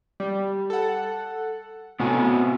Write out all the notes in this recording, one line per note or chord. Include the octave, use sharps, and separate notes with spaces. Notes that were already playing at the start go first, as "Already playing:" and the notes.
G3
A4 F#5
A2 C3 B3 F#4 G#5